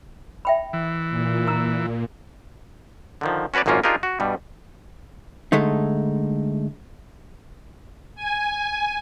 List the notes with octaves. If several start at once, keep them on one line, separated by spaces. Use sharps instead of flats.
E5 G5 B5
E3
A#2
D#4 A#5 E6
D3 D#3 F3
C#4 F#4 B4 C#5 D5
G#1 F#2 A#2 A#3 C#4 F4
D4 D#4 F4 G4 G#4 A#4
F#4
G2 B2 G3
D3 G#3 A3 D#4
G#5